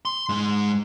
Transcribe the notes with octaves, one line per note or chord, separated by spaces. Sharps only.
C6
G#2 G#3